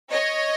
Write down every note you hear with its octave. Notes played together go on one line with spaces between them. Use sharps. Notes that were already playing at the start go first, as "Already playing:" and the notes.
C#5 D#5